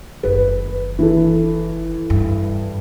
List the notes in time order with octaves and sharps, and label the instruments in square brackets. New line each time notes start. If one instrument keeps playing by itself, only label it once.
[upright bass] F#1 D#3 [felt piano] B4
[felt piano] E3 A4
[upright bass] G2